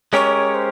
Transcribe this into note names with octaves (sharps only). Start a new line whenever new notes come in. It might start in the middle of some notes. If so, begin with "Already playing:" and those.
G#3 C#4 G4 A#4 C#5
C5